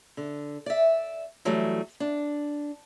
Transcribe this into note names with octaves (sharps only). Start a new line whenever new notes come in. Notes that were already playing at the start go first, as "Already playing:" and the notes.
D3
D5 E5
E3 F#3 G3 A3
D4